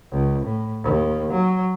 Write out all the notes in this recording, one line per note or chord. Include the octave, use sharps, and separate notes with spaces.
C#2
A2
D#2
F#3